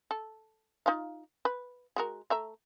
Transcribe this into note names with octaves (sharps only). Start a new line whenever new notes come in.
A4
D#4 F4 F5
B4
G#3 F#4 A#4
A3 E5 A#5